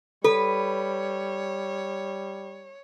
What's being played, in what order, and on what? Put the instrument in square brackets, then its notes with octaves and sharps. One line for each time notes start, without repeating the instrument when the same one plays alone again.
[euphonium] G3 [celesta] A4 [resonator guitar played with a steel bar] B4 [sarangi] C#5